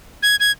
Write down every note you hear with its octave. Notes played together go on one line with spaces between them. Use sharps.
G#6
G#6